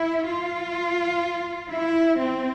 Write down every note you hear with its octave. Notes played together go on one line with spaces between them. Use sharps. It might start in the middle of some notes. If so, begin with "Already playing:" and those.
Already playing: E4
F4
E4
C4